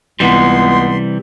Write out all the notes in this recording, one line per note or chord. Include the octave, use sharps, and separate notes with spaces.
C#2 C3 E3 G3 B3 C6